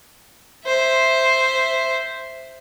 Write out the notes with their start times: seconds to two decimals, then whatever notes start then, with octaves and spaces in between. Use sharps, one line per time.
0.66 C5 E5